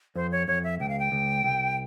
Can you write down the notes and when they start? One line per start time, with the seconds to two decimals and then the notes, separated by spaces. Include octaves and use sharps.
0.16 F2 C5
0.32 C#5
0.48 F2 C#5
0.64 E5
0.80 C#2 G5
0.89 F5
0.99 G5
1.12 C#2
1.44 C2